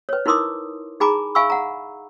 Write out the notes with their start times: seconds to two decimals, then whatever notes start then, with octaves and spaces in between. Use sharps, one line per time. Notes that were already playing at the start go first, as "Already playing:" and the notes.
0.09 B4 C#5
0.26 D#4 E4 A#4 C6 D6 D#6
1.00 D#4 G#4 G#5 A#5 B5 D6
1.35 E5 F5 G#5 B5 C#6 E6
1.50 F#5 A#5